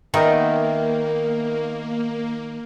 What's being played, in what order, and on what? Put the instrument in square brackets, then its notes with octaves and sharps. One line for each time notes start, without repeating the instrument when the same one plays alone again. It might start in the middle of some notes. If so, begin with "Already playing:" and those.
[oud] D#3 [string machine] A#3 [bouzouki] B3 E5 G5 [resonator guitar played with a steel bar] A#4 D#5